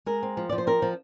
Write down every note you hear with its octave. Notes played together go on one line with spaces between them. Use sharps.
G#3 A#4
C4
F3
F3 D5
C5
C4 A#4
F3